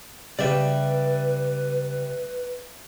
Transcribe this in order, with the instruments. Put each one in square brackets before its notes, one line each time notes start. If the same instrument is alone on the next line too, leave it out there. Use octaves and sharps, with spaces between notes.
[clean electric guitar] C#3 [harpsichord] G3 [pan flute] B4 [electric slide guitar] D5 E5